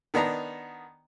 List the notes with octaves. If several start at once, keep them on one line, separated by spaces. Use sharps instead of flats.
D#3 B3 D4 A#5